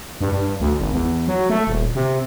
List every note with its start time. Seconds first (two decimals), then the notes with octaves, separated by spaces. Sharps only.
0.21 G2
0.32 G2
0.60 D2
0.80 G#1
0.93 E2
1.28 F#3
1.50 A3
1.67 D#1
1.95 C3